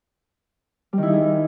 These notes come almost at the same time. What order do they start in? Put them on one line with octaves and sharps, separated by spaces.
G3 D#3 E4 D#4 G#4